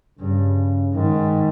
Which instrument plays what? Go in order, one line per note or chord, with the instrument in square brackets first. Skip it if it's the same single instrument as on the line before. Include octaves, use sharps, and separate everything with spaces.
[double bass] G2 [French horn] C#3
[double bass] G#2 [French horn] D#3